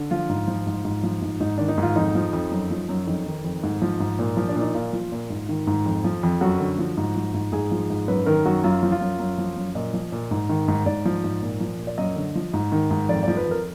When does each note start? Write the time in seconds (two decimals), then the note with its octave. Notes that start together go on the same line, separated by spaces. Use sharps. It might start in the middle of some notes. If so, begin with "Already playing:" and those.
Already playing: D3
0.11 F3 F4
0.29 G#2
0.48 F3
0.66 G#2
0.85 G#2
1.03 F3
1.22 G#2
1.40 G#2 D#4
1.58 D#3 D4
1.68 D#4
1.78 G#2 F4
1.96 F2 D#4
2.15 F3
2.33 F2
2.51 F#2
2.70 F3
2.89 F#2
3.07 F2 D#4
3.26 D#3
3.44 F2
3.63 G#2
3.82 F3
4.00 G#2
4.19 A#2
4.37 F3
4.49 D4
4.56 A#2
4.61 D#4
4.74 A#2 F4
4.93 F3
5.12 A#2
5.30 G#2
5.49 D#3
5.67 G#2
5.86 F2
6.04 F3
6.23 F2
6.41 F#2 F#4
6.60 D3
6.79 F3
6.97 G#2
7.16 F3
7.34 G#2
7.52 G#2 G#4
7.71 F3
7.90 G#2
8.08 F#2 B4
8.26 D#3 A#4
8.46 F#2 F#4
8.64 F#2 F4
8.83 F3
8.92 F4
9.01 F#2
9.20 F#2
9.38 F3
9.57 F#2
9.75 A#2 D#5
9.94 F3
10.12 A#2
10.31 G#2
10.50 D#3
10.68 G#2
10.86 G#2 D5
11.05 F3
11.24 G#2
11.42 A#2
11.60 F3
11.79 A#2
11.87 D5
11.98 F#2 D#5
12.16 D3
12.35 F3
12.53 G#2
12.72 D#3
12.91 G#2
13.09 F2 D5
13.23 F3 D5
13.37 B4
13.46 F2 A#4